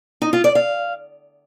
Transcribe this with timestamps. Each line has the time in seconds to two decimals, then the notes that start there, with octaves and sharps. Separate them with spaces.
0.22 D#4
0.33 F4
0.44 D5
0.55 F5